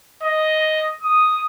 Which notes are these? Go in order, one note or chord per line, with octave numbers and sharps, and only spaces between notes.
D#5
D#6